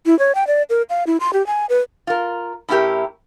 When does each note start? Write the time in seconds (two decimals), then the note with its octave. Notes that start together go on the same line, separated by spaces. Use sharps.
0.06 E4
0.19 C#5
0.35 G5
0.47 D5
0.70 A#4
0.90 F5
1.07 E4
1.20 C6
1.33 G4
1.47 G#5
1.69 B4
2.07 F4 A#4
2.69 A2 C#4 E4 F#4 G4 A#4